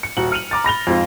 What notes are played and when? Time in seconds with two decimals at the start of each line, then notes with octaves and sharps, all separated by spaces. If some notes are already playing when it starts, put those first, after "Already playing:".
0.03 C#7
0.17 D#1 F#4 F#7
0.32 F6 C#7 D#7 F7 F#7
0.51 A#5 D6 A6
0.64 B5 A#6 F7 G7
0.87 F2 G#2 F4